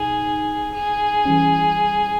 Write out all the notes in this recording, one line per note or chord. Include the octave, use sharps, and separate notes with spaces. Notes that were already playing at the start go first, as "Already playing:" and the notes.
Already playing: B2 D#4 G#4
G#4
E3 G3 C#4